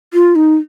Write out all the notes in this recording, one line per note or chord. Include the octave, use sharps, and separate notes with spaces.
F4
D#4